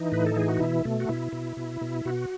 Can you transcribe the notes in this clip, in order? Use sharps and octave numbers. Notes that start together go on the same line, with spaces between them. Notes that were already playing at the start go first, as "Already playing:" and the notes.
Already playing: E3 D#4
A2 B4
A4
E3 G#4
F#4
B2 E4
B2 A3
F#4
B2 E4
B2
B2
B2
B2 F#4